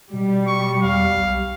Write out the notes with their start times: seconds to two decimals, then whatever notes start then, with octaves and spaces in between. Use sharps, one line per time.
0.13 B2 G3
0.47 C#6
0.83 E2 F5
1.17 B1